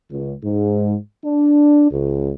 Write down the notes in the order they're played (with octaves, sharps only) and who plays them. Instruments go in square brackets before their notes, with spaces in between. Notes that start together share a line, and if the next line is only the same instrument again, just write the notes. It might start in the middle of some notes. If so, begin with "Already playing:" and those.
[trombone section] C#2
G#2
D4
C#2